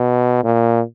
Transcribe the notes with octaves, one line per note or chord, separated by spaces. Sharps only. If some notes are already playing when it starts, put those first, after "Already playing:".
Already playing: B2
A#2